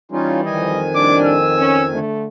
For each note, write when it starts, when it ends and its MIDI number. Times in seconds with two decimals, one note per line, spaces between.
0.12 0.84 52
0.12 0.84 55
0.12 0.41 61
0.12 0.41 63
0.12 0.41 65
0.46 1.99 41
0.46 1.99 51
0.46 0.82 75
0.46 1.99 80
0.96 1.37 45
0.96 1.37 55
0.96 1.37 62
0.96 1.18 86
1.24 1.89 88
1.57 1.83 61
1.92 2.28 50
1.92 2.28 57